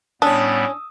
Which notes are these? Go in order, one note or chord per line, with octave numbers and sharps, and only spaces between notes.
A2 G3 B3 C#4 D4 C#5 D#6 E6